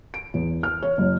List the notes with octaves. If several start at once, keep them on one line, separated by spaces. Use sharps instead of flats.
D7
E2
F6
C#5
F#1